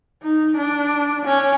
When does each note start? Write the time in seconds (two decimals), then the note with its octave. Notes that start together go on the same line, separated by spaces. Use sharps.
0.23 D#4
0.57 D4
1.25 C#4